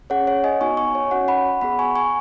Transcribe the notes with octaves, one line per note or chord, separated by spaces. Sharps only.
C#4 G#4 C#5 F#5
C#5 F#5
D#5 G#5
B3 D#4 F#4 G#5 C#6
G#5 C#6
C#5
C#4 F#4 C#5 F#5
F#5 B5
B3 G#4 F#5 B5
G#5 C#6
G#5 C#6